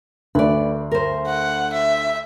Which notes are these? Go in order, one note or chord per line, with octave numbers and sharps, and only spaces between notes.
D2 B4 D5
A#4 C5
F#5
E5